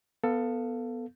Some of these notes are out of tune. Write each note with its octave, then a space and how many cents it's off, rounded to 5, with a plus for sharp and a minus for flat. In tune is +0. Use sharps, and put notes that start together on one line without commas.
B3 +0 A4 +15 F5 +0